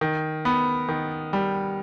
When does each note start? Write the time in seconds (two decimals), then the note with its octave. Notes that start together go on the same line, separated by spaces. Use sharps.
0.01 D#3
0.45 B3
0.89 D#3
1.33 G3